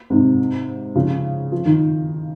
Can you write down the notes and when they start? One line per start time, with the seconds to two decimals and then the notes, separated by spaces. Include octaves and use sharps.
0.10 G#2 C3
0.95 C#3 F3
1.52 F3
1.66 D#3